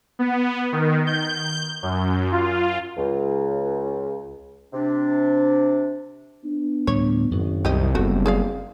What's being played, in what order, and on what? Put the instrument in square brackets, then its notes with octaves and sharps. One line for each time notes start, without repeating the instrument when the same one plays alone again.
[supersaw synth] B3
D#3
G6
F#2
F4
[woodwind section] C#2
C3 D4
[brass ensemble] B3 D4
[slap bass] D2 A2 G3 [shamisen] C#5
[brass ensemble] G#1 [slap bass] F#2 F#3
[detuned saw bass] C2 [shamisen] G4 D#5
[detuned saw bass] F#1 [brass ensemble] F#2 G3 B3 [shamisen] A3 F#4 G4 [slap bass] C4
[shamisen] G#4 D5 F5